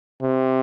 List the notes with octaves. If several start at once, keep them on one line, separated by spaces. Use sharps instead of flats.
C3